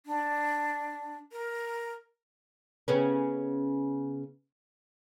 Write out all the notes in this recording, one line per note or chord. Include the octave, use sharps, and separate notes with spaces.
D4
A#4
C#3 B3 C#4